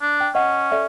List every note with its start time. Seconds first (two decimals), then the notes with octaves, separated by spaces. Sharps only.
0.02 D4
0.21 G5
0.35 C#4 D#5 F#5
0.71 A4 D5 E5